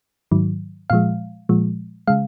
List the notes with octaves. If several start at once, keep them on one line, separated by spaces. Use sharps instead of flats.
G#2 D#3 F#3
A#2 F3 G#3 F5
A#2 F3 G#3
C#3 G#3 F5